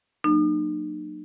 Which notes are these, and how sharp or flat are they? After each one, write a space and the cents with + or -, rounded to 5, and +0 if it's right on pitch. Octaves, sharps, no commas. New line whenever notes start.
F#3 +0 A#3 -5 D#4 -45